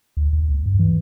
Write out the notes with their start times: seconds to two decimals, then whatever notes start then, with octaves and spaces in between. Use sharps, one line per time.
0.17 D2
0.33 D#2
0.50 C#2
0.66 G2
0.79 E3